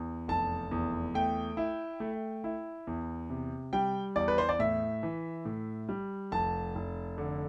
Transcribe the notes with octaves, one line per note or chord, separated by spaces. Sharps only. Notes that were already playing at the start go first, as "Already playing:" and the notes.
Already playing: E2
F1 A5
E2
A3 G5
E4
A3
E4
E2
C3
G3 G5
E2 D5
B4
C5
D5
A2 E5
E3
A2
G3
F1 A5
F1
D3